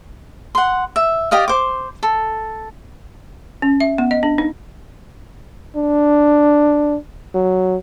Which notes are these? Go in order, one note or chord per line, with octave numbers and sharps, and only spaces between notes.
F#5 C6
E5
G4 D5 D#5 F5
C5 D6
A4
C#4
E5
B3
D#5
D4
D#4
D4
F#3